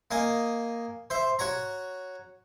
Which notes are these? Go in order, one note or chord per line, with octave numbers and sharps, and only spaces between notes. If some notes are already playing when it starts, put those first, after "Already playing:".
A#3 D#5 G#5
C5 E5
F#4 C#5 A#5